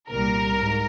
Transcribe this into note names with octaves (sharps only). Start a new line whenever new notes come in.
C2 A#2 G3 A#4
G#2